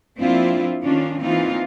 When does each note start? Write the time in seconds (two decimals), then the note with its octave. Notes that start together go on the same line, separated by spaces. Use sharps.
0.17 F3 A#3 C4 D4 E4 F4
0.83 D#3 C#4 D4 F4
1.21 E3 A#3 C4 D#4 F4